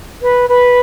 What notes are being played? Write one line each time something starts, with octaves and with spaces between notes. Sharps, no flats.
B4
B4